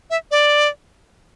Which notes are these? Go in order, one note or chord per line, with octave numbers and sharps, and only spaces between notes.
E5
D5